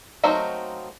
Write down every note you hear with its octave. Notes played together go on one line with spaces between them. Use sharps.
F#3 A3 A#3 C4 D#4